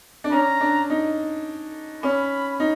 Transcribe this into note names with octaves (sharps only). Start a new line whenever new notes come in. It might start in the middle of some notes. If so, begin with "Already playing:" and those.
D4
C#4 A#5
D4
D#4
C#4 B5
D#4